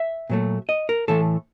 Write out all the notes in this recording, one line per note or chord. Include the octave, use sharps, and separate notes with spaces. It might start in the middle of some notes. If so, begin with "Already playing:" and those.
Already playing: E5
A#2 F#3 A3
D#5
A#4
A2 E3 A3 A4